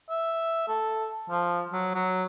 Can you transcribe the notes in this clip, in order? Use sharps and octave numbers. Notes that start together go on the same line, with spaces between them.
E5
A4
F3
F#3
F#3